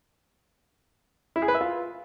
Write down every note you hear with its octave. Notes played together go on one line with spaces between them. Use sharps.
E4
G#4
B4
E5
F4